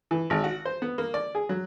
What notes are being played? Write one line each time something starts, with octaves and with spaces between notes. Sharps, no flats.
E3
G#1
F#4
C5
B3
A#3
D5
G#4
F#3